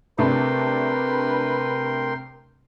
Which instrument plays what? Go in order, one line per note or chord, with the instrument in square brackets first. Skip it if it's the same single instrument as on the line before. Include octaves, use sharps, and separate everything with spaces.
[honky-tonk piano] C3 A3 D4 [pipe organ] A#4 G5 C6 [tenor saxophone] B4